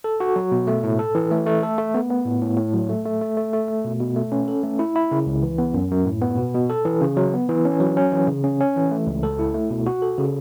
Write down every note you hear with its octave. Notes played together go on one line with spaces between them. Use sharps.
A4
F#4
F#3
B2
A3
A2
A4
E3
A3
A3
A4
A3
B3
B3
A2
A2
A2
F#3
A3
A3
A3
A3
A3
A3
B2
B2
A3
C#4
A4
A3
E4
E4
C#3
C#2
E3
B3
F#2
F#2
A2
B3
B2
B2
A4
E3
C#3
F#3
B3
E3
C#4
F#3
C#4
E3
C#3
C#4
C#4
E3
A3
C#2
A4
E4
A3
B2
F#4
A4
C#3